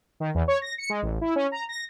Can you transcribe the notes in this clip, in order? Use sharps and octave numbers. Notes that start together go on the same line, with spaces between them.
D#3
E2
C#5
A#6
C#7
G#3
A1
E4
C#4
A#5
A#6